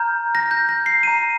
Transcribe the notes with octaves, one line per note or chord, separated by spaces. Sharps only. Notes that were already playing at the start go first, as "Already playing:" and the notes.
Already playing: A#5 F6 G6
A#6
G6
A#6
C7
A#5 G6 D#7